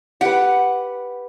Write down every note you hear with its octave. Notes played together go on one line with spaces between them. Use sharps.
G4 B4 F#5